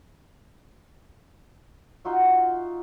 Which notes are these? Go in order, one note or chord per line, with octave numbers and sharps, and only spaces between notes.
D#4 F4 F#4 E5